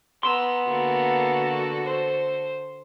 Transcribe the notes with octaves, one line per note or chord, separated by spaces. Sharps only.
B3 A#5 C6 E6
D3 A#3 F#4 A4
C5